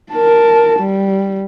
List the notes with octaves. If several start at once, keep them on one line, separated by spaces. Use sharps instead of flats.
A#4 A5
G3